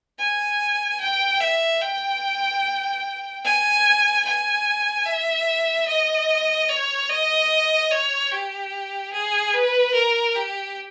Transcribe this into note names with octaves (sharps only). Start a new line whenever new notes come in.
G#5
G5
E5
G5
G#5
G#5
E5
D#5
C#5
D#5
C#5
G4
G#4
B4
A#4
G4